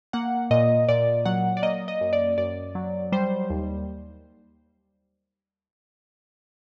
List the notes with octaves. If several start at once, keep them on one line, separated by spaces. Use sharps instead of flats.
A#3 F#5
A#2 D#5
A#2 D5
F#3 F#5
D5
A#3 D#5
D#5
F#2
D5
F#2 D5
F#3
G3 C5
D#2